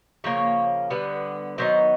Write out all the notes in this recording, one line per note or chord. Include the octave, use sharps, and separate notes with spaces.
C#3 F3 A#3 C#4 C#5
D3 G3 B3
D#3 F#3 B3 D#4 C5